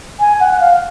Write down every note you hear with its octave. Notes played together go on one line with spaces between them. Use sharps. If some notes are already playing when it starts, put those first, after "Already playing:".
G#5
F#5
F#5
F5